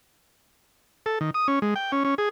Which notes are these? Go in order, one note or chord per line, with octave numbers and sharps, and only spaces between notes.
A4
D#3
D#6
C#4
G#3
G5
C#4
C#4
G#4